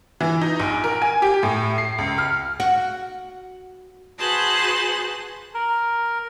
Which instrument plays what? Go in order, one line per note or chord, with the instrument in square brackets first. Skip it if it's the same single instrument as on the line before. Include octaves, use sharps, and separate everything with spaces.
[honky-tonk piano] E3
D#4
A#1
A#4
G#5
G4
A2
C7
C#2
F6
[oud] F#4
[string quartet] F#4 G#4 B4 C5 A5 F#6
[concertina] A#4